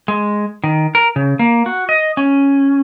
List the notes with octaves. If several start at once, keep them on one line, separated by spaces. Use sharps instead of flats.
G#3
D#3
A#4
C#3
A#3
F#4
D#5
C#4